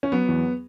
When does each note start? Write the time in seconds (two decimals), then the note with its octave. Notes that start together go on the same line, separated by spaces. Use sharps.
0.03 C#4
0.12 F#3 B3
0.29 E2